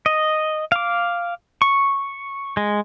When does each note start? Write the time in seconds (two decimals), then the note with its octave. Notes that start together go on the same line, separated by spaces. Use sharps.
0.06 D#5
0.72 F5 D6
1.62 C#6
2.57 G#3